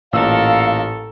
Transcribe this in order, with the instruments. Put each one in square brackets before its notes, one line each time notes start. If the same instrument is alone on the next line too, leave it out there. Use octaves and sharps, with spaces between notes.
[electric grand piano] A1 A#2 E6 [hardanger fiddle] A4 A#4 [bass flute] F5